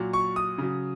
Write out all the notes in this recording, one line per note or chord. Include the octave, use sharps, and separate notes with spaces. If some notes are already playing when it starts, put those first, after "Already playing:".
Already playing: A#2 F#3
C#6
D#6
C#3 F#3